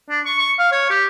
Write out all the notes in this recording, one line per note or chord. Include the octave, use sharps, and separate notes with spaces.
D4
C#6
C#6
F5
C#5
G4